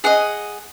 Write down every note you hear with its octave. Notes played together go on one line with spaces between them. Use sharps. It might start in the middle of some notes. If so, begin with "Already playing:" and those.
G#4 D#5 F#5